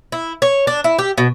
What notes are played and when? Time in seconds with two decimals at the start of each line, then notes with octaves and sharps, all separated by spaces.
0.12 E4
0.42 C#5
0.67 D4
0.84 E4
0.99 G4
1.18 B2